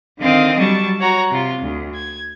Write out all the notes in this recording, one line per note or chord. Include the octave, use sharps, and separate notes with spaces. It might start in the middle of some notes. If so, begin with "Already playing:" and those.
D3 D#3 C4 D#5 F5 D#6
F#3 G3 A5 C#6
F#4 C#5 F#5 A#5
C3 F4
D2
G#6